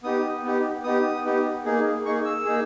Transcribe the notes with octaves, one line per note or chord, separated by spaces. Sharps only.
B3 D#4 G4 D#6
B3 D#4 G4
B3 D#4 G4 D#6
B3 D#4 G4
A#3 D#4 G#4
A#3 D#4 G#4 C#6
E6
A#3 D#4 G#4